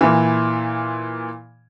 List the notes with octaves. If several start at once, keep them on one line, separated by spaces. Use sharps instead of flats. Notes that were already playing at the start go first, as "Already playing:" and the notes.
A#2 E3